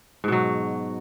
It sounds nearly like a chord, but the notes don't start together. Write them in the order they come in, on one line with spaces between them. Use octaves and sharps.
G#2 B2 F#3